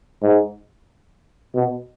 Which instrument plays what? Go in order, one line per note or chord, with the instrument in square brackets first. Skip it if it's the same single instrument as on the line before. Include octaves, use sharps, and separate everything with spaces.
[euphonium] G#2
B2